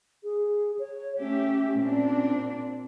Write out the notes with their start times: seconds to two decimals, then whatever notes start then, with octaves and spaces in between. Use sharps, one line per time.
0.24 G#4
0.79 C#5
1.20 A3 C#4 G4 E5
1.78 A#2 C4 D4